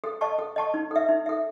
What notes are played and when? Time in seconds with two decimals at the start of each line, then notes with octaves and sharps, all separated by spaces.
0.04 A4
0.21 D#5 A5 C#6
0.39 A4
0.56 D#5 A5 C#6
0.74 D#4
0.91 A4 E5
1.09 D#4
1.26 A4 E5